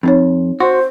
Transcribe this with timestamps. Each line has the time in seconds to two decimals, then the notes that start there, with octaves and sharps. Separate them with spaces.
0.03 F2 C4 D#4 C#5
0.60 F#4 C5 C6